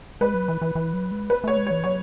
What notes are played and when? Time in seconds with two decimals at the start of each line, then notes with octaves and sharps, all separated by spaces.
0.21 G#3 B4
0.34 F#3
0.48 E3
0.62 E3
0.75 E3
0.93 F#3
1.11 G#3
1.30 B4
1.44 A3 C#5
1.57 G#3
1.67 C#5
1.71 E3
1.84 F#3 C#5